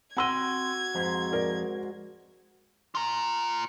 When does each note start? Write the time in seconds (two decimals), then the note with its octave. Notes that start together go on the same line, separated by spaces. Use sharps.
0.17 C4 F#4 F#5 B5 C6 E6 G#6 D#7
0.95 F2 G#2 F#4 C6
1.32 G#4 A#4 D5
2.95 F4 A#5